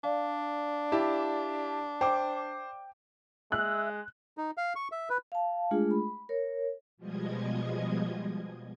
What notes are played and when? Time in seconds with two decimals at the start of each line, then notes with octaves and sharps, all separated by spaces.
0.04 D4 D5 F5
0.92 E4 G4 A5
2.01 C5 G5 D6
3.52 G#3 E5 F#6
4.38 D#4
4.58 F5
4.76 C#6
4.92 E5
5.10 B4
5.32 F5 A5
5.71 G#3 A3 D4 F4 G#4
5.91 B5
6.29 A#4 C#5
6.97 B2 F3 G3 G#3 D#5 G#6